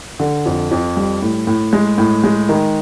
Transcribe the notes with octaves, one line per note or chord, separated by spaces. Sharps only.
D3
F2
F2
G3
A2
A2
G#3
A2
G#3
D#3